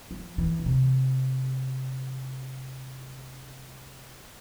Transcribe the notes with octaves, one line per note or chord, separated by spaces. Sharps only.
F3
E3
C#3
C3